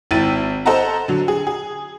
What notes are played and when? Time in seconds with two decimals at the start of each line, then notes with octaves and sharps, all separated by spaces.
0.11 G#1 E4 G5 A6 D#7
0.66 A4 C5 D#5 F#5 A5 A#5
1.08 D3 F#3
1.28 G#4
1.47 G#4